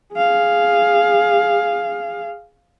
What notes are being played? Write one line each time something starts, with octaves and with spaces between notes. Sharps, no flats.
G#4 F5